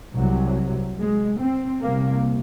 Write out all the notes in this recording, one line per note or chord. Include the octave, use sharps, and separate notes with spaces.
C2 C3 F#3
G#3
C4
C2 C3 A#3